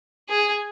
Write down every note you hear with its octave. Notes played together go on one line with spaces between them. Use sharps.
G#4